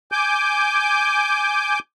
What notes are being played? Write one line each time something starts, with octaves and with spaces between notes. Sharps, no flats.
G#5 D6 G6